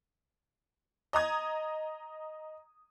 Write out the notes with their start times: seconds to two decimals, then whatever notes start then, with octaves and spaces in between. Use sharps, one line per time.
1.13 D#5 A#5 D#6 G#6